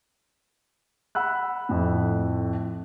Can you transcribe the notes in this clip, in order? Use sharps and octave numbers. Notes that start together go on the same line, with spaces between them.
F#5 B5 E6 F#6
F2 A2